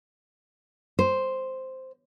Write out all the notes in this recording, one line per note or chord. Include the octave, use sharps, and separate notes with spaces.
C5